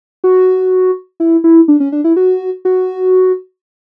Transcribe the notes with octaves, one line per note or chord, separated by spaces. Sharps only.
F#4
E4
E4
D4
C#4
D4
E4
F#4
F#4